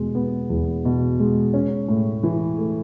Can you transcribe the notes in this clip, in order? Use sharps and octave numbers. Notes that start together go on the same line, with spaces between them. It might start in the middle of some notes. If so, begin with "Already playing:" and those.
Already playing: E2 B2 G#3
B3
E2
B2
G#3
C#4
A2
E3
A3